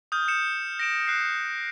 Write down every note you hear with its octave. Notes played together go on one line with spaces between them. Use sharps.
D#6 F6 G6
G6 C#7 E7
A#6 D7 E7
F#6 C7